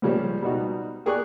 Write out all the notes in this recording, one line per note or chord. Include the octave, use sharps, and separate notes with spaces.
C#2 C#3 F3 G3
B2 G3 D#4 F#4
G4 G#4 A#4 D5 C#6 F#6